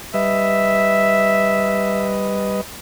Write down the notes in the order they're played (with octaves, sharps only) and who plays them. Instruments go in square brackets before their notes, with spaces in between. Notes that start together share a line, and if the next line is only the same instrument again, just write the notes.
[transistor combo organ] G3 B4 D#5 [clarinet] E5